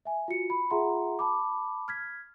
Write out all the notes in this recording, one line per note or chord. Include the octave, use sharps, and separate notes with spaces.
E5 G#5
F4 F#4 C#7
B5
F4 G#4 E5 F#5 A#5 C6
A5 B5 D6
F6 G#6 B6